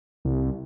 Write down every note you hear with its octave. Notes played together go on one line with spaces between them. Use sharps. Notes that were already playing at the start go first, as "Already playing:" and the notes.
C2